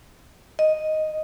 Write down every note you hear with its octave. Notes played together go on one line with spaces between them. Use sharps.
D#5